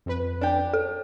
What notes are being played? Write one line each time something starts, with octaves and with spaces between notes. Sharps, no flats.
F2 B4
D4 G4
A4